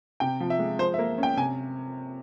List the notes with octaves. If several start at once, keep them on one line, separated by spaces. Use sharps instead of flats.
C3 G5
F3
E5
G#3
F3 C5
E5
A#3
C#4 G5
C3 G#5